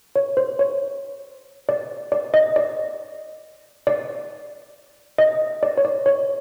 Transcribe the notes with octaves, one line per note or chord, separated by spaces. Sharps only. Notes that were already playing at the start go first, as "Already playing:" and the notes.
C#5
C5
C#5
D5
D5
D#5
D5
D5
D#5
D5
C#5
D5
C#5